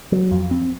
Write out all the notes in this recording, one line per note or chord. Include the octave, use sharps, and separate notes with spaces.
F#3
F2
C4